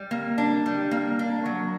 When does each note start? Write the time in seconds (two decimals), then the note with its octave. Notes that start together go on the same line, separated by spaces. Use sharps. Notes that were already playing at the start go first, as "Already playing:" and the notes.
Already playing: G3
0.11 A#3
0.38 D4
0.66 G3
0.91 A#3
1.19 D4
1.46 F#3